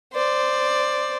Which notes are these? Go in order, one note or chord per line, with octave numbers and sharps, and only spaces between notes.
C5 D5